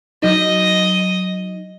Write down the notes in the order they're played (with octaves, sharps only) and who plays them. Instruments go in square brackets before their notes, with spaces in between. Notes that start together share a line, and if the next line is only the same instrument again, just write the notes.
[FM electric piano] F#3 D#4 [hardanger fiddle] D#5